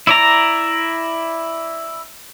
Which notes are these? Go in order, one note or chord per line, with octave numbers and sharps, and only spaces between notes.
E4 D5 A#5